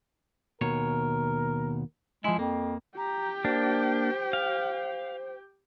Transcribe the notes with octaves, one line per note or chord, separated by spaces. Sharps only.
D#2 B2 A#4 C#5
F3 G#3 E4
F2 A#3
G4 G5 A#5
A#3 D4 C5
F5